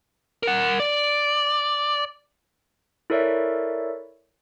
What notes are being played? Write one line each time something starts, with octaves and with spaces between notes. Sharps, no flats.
A#4 F#5
D5
E4 A4 A#4 C#5 D5 E5